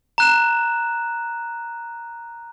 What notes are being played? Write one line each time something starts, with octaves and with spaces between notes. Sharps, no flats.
A#5 F#6 E7